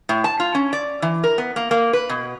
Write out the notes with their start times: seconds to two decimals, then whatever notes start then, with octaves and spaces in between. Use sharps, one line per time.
0.09 A2
0.24 A5
0.40 F4
0.55 C#4
0.73 D5
1.02 E3
1.24 A#4
1.38 B3
1.56 A#3
1.71 A#3
1.93 B4
2.09 B2